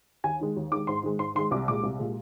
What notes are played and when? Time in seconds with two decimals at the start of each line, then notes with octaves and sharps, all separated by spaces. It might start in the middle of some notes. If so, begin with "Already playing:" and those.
0.24 D#2 G#5
0.41 D#3 G#3
0.56 D#2
0.72 D#3 G#3 D6
0.87 G#2 C6
1.03 D#3 G#3
1.19 G#2 C6
1.35 D#3 G#3 C6
1.51 C2 D6
1.68 A#2 G#3 D6
1.83 C2
1.99 A#2 G#3